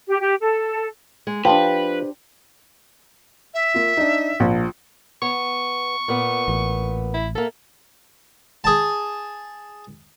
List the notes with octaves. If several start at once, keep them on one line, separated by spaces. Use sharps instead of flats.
G4
G4
A4
G#3
F3 D4 G4 B4 C5 G5
E5
A#3 F4
D4 D#4
A#1
B3 C#6
A#2 B3
A1
E4
A#3 A4 E5
G#4 A5